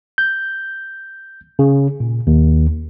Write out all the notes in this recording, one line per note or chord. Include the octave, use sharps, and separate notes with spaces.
G6
C#3
A#2
D#2